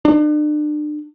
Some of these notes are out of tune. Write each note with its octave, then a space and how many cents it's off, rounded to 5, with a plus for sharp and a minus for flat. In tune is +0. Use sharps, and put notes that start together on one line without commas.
D4 +35